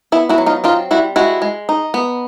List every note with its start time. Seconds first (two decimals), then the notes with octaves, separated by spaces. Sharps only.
0.12 B3 E4
0.29 E4 F#4
0.38 F#3
0.46 D#4 F4
0.64 C4 D#4 F4
0.91 G3 E4 F#4
1.16 G#3 E4 F#4
1.42 G#3
1.69 D#4
1.94 B3